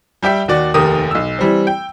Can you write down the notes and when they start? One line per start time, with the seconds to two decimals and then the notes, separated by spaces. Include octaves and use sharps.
0.23 G3 G4 E5 G5
0.48 D#2 F#4 D5
0.74 F1 D#2 G4 A#4 D#6
1.11 B1 E6
1.39 E3 G3 C4
1.67 G5